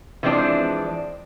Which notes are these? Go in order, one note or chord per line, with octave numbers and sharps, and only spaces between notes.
E3 F3 G#3 C4 D4